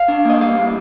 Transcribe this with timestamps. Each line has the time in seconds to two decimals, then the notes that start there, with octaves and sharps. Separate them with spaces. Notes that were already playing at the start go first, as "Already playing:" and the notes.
Already playing: F5
0.08 D4
0.25 A#3 D#5
0.41 G3 F5
0.58 A2